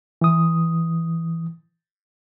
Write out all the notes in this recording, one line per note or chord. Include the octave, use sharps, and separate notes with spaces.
E3 D#6